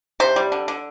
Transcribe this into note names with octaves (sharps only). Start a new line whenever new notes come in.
C3 C5
G3
D3
D3